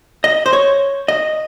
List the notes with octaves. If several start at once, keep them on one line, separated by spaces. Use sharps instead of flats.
D#5
C5
C#5
D#5